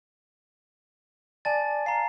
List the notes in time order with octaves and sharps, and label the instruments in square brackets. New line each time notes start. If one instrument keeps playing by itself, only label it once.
[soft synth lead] D5 [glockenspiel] G#5 A5 A6
[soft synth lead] F5 [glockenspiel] A#5 C7